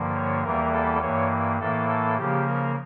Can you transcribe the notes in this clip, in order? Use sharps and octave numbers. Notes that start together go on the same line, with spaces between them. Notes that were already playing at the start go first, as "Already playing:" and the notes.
Already playing: G2 D3 F3 A#3
C#5
E2 E3 G3 A#3 A#4
A4
G2 E3 A#3 C#5
A2 E3 A#3 A4
A4
C#3 F3 A#3 G4
A#4